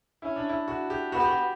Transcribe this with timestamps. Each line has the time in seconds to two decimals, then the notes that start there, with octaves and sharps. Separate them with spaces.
0.22 C#4 E4
0.36 D4
0.49 E4
0.68 F#4
0.90 G4
1.12 B3 F#4
1.20 G4
1.28 F#4